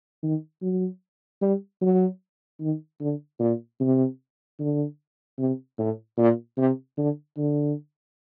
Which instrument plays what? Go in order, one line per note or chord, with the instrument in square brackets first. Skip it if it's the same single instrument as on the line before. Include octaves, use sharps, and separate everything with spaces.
[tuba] D#3
F#3
G3
F#3
D#3
D3
A#2
C3
D3
C3
A2
A#2
C3
D3
D3